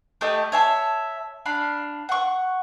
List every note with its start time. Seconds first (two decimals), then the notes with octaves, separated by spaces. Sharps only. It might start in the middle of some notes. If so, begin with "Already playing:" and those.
0.21 A3 G4 D#5
0.52 C#5 E5 A5
1.46 D4 F5 B5
2.09 F#5 C#6